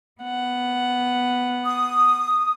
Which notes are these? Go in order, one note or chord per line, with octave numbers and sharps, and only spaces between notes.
B3 F#5
D#6